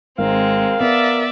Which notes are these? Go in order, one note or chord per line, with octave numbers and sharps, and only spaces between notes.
G#1 G#3 C4 A#4 F5
B3 D5 E5 A6